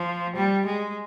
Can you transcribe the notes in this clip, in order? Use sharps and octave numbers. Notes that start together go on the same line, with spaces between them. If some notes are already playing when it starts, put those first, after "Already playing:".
Already playing: F3
G3
G#3